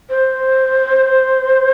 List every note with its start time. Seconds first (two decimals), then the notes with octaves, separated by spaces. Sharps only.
0.10 C5